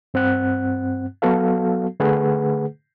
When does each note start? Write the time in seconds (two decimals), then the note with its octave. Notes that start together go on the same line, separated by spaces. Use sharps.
0.14 G2 C4 F#5 F#6
1.22 F#3 B3 F#4 A4 F5
2.00 D3 A3 G#4 B4 F#5